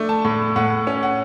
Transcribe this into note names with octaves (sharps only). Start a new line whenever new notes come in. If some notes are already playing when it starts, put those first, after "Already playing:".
Already playing: A3 D4
A5
A2
A2 F#5
C#4
F#5